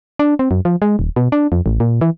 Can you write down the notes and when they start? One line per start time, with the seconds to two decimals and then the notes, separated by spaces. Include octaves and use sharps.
0.19 D4
0.39 C4
0.51 F#2
0.65 F3
0.82 G#3
0.99 D#1
1.16 B2
1.32 D4
1.52 F2
1.66 A1
1.80 A#2
2.01 E3